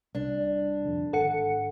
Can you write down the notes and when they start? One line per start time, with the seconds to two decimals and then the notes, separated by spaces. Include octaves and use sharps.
0.15 C2 D4
0.85 F2 D3
1.13 G#1 A4 F#5 C#7